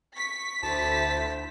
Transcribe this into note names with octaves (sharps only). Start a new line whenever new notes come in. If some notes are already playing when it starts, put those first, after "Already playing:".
C#6 B6
D2 E4 C5 A5